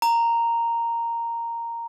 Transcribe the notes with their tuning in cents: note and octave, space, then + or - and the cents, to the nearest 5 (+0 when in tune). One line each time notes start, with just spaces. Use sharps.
A#5 -5